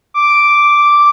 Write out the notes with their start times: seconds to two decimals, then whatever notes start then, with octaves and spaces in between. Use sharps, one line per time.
0.14 D6